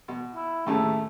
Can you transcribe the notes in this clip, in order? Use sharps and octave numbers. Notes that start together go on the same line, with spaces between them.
B2
E4
D#2 A2 C#3 A3